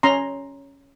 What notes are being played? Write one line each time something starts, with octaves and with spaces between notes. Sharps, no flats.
C#4 A#5 C6